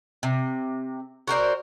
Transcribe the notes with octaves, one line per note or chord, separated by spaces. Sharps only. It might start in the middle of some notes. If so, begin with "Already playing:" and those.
C3
F#4 A#4 C5 D5